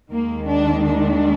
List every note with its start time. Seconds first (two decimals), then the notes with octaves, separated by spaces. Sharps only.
0.11 D#2 D#3 G#3 A#3
0.48 D4
0.84 D4